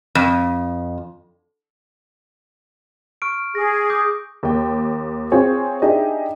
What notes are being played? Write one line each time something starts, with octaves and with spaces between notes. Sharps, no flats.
F2
C#6 F6 D7
G#4 A#6
D6 D#6 G6
D#2 G5
C4 F4 G#4 C#5
D4 D#4 G4 G#4 D#5 E5